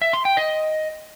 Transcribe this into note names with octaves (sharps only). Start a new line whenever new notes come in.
E5
C6
G5
D#5